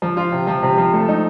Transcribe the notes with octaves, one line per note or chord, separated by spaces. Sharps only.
F3
F4
C3
F3
C3
F3
A3
D#4